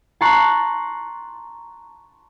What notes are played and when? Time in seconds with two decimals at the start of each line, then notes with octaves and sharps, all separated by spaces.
0.21 A5 A#5 C6 C#6 F#6